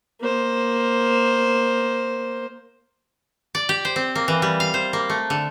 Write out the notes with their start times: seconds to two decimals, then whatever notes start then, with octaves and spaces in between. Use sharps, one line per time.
0.20 A#3 C5
3.55 D5
3.69 G4
3.85 C5
3.96 C4
4.15 A#3
4.28 E3
4.42 G3
4.60 F5
4.74 C5
4.93 A#3
5.10 A3
5.30 D3